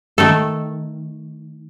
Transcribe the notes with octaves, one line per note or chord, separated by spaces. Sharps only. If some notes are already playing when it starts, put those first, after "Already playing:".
D#3 A3 A4